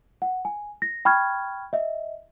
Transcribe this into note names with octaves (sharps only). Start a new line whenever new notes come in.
F#5
G#5
A#6
G5 B5 C#6 F6 G#6
D#5 E5